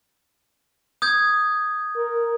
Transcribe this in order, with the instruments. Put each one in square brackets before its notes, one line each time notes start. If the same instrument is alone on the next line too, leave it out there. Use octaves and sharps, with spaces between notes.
[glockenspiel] D#6 G6 G#6
[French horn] A#4